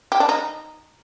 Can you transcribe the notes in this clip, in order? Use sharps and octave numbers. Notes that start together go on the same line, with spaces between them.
G4
D4
D#4